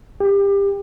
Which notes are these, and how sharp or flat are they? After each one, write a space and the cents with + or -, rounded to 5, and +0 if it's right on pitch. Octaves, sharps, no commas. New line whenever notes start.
G4 +25